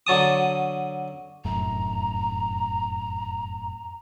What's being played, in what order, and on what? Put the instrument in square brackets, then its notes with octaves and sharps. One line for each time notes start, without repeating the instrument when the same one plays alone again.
[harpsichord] D3 F#3 A5 D#6
[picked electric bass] F1 F#2 A2 [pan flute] A#5